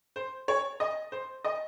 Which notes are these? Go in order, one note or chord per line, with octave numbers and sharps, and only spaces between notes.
C5
C#5
D#5
C5
D#5